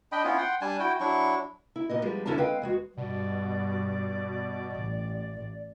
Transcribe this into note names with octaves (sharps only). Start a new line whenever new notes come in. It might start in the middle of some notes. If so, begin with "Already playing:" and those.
D4 D#5 G5 B5
B3 C#4 E4 F4
F#5 G5 C6
G3 D4 G#5 A5
E4 F#4 G5
F#3 D4 E4 C#6
E4
A#2 B3 D#5
F3 G3 G#3 B3
E2 D3 C#4 E4 D5 A5
G#3 C4 B4 F5 G5
E2 G#3 F#4
G2 B2 D5
A1